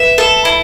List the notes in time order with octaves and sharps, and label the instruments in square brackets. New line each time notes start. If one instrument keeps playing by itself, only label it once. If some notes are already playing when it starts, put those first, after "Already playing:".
Already playing: [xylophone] B4 [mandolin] E5
[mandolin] A4
E4